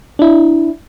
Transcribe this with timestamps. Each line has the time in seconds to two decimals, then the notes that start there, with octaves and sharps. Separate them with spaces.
0.19 D4 E4